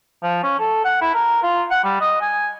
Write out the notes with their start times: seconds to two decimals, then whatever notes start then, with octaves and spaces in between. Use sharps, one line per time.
0.23 F3
0.43 C#4
0.59 A4
0.85 F#5
1.01 E4
1.14 A#4
1.43 F4
1.70 F#5
1.84 G3
2.01 D#5
2.21 G#5